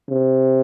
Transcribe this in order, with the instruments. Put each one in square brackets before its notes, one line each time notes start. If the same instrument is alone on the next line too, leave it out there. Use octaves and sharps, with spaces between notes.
[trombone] C3